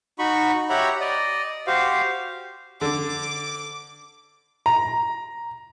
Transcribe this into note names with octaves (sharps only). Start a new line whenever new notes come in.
D#4 F#4 B5 C#6
G4 C#5 E5 F#5 A#5 B5
D5 D#5
F#4 G4 C5 F5
D3 D6
A#5